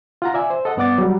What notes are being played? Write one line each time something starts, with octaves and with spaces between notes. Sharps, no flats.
F4 F#5 A#5
D5 E5 G#5
C5
A4 D#5 F#5
G2 B3 D5 F#5 D6 A6
F#3 G3